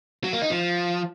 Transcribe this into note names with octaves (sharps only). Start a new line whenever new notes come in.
F#3
A#3
D#4
F3